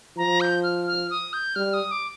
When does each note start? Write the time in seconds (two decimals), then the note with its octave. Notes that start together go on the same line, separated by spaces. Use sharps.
0.17 F3 A#5
0.41 G6
0.63 F6
0.87 F6
1.10 D#6
1.33 G6
1.56 G3 F6
1.74 D#6
1.91 D6